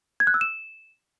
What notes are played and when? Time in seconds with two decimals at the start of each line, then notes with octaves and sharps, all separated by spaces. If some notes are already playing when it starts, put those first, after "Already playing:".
0.20 G#6
0.27 F#6
0.34 E6
0.41 E7